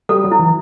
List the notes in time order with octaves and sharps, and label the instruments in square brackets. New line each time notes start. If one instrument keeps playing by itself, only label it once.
[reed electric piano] G3 [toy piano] A4
[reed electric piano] F#3
[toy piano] E4
[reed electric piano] E3